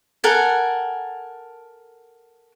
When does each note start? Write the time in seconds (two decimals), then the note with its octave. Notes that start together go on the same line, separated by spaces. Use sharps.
0.24 A4 A#4 F#5 G#5